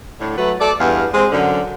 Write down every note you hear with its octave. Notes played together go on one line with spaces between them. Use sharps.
A2 D3
F#3 A3 B4
A4 D5
E2 G2 F5
G#3 C4
F#2 D3